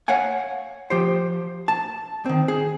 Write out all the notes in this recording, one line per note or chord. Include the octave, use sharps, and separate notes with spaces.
C#5 F5 F#5 G#5
F3 G4 C5
A5
D#3 C4
G#4